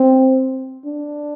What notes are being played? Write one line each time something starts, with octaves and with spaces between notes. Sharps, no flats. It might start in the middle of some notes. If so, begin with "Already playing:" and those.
Already playing: C4
D4